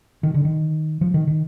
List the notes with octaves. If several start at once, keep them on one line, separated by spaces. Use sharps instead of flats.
D#3
D3
D#3
F3
D#3
D#3